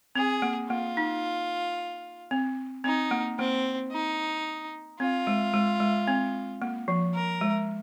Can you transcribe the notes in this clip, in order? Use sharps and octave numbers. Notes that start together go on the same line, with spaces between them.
C4 G#4
A#3
A#3 F4
D#4
C4
C4 D#4
A#3
A#3 C4
D#4
C4 F4
G#3
G#3
G#3
C4
A#3
F3
A#4
G#3